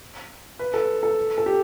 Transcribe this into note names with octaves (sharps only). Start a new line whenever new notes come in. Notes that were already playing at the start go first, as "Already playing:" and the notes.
B4
A4
A4
A4
G4